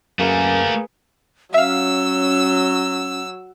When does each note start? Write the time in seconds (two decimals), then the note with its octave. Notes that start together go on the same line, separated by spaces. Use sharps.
0.19 F#2 A3 A#3 F#4 G#4 A#4 B4
1.54 F#3 C#4 E5 F5 E6